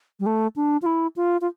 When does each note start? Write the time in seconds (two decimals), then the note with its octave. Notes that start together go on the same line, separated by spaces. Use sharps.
0.20 G3
0.26 A3
0.56 D4
0.82 F4
0.86 E4
1.16 F4
1.41 F4